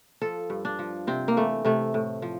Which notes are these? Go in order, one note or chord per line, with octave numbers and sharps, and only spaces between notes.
F3 A4
G2
D4
F3
C3 C4
A#3
E3 A3
C3 A3
A2
F3